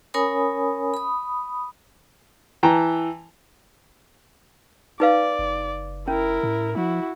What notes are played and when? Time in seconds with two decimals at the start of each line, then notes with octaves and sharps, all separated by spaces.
0.14 C#4 A#4 C#5 G#5 B5 D#6
0.94 B5 D#6
2.63 E3 G5 A5 A#5
5.00 D#4 B4 D5 F5
5.39 F#1
6.08 C#4 E4 A#4
6.43 A2
6.76 F3 E4 F#4